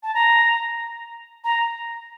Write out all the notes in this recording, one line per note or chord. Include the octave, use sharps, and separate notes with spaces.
A5
A#5
A#5